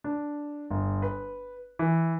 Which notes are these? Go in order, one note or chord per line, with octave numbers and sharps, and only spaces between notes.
D4
G1
B4
E3